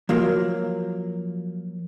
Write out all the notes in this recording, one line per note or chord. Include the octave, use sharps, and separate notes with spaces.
F3 F#3 A#3